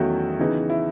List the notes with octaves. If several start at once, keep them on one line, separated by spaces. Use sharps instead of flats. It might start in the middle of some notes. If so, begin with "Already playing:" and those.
Already playing: E2 D#3 F#3 A3 C#4 E4 F#4
C#3 E3 B3 D#4
E4